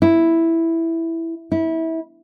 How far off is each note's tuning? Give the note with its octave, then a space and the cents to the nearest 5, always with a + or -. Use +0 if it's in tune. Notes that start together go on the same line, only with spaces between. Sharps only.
E4 +0
E4 -25